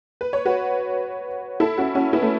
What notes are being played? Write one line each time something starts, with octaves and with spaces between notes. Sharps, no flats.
B4
C#5
F#4 B4
E4 A4
C#4 F#4
C#4 F#4
B3 E4
A3